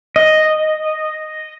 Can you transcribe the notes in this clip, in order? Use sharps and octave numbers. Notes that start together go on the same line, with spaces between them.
D#5